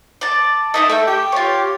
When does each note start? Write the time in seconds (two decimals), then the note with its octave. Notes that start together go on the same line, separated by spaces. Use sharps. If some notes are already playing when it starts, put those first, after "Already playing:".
0.21 D5 A5
0.74 D#4 E4 A4 D#5
0.89 A3 E5 G5
1.07 G4
1.32 F4 C#5